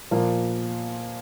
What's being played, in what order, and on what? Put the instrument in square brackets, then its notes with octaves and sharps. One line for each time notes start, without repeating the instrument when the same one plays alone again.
[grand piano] A#2 F3 A#3